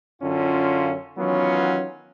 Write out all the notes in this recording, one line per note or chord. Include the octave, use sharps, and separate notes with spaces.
F#2 D3 C#4 F4
D#3 E3 F#3 B3 C#4 F4